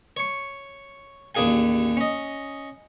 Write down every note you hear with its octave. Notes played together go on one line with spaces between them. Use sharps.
C#5 C#6
A1 D#2 D4 G#4 F5 G#5
C#4 D#5